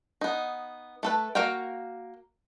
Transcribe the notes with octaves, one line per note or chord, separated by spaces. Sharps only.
B3 D#4
A3 A4 B4
A#3 F#4 A#4 F5 G5